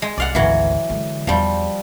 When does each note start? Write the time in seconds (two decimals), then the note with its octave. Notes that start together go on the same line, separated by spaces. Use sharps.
0.02 G#3
0.18 C2 D5 F5 F#5
0.35 G#1 D2 E3 F#3
0.90 D3 G#3
1.27 E2 F3 G3